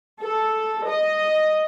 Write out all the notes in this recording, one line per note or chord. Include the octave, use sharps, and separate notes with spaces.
A4
D#5